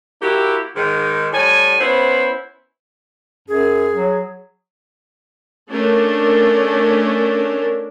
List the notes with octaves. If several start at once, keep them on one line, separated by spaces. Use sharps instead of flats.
A#3 E4 F#4 G4
G#2 D#3
A2 G3 G#5
B3 C#4 E4 C5
F#2 G#4
F#3
A3 C#4 D4 A#4